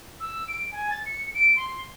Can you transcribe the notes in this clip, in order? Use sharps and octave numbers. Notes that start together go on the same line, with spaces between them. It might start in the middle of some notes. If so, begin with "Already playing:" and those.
E6
D7
G#5
A6
C#7
D7
C6